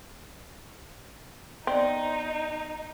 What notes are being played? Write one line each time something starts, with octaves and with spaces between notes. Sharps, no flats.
B3 C4 D#4 D5